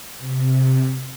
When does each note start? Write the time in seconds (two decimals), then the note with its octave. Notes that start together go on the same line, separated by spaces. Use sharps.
0.18 C3